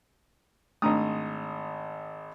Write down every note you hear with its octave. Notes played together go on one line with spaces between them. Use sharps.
G#1 A3 D4 A#5 D#6